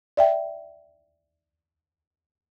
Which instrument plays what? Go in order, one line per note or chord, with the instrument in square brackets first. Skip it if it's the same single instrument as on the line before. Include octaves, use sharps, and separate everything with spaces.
[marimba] D5 E5 G5